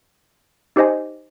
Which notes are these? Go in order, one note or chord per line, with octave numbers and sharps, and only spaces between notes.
D#4 G4 C5 D#5 G#5